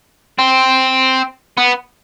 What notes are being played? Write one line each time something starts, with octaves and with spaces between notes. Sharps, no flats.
C4
B3